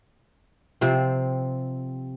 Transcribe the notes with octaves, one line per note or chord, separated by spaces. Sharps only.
C3 F3 C4